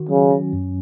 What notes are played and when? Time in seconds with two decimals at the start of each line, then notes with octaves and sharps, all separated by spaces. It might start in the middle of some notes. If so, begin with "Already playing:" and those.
Already playing: D#3 F#4
0.09 C#3 F#3
0.31 C#4
0.53 F#2